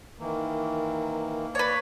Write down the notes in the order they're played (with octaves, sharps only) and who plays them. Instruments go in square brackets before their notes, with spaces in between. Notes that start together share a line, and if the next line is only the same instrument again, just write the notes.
[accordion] D#3 E3 [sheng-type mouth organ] A#3
[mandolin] B4 C#5 [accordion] D5